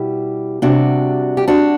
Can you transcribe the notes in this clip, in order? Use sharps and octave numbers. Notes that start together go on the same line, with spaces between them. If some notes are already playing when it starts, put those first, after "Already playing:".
Already playing: B2 G3 E4 G4
C3 G3 D4 F#4
G4
D4 F#4